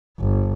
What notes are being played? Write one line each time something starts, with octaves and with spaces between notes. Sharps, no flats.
G1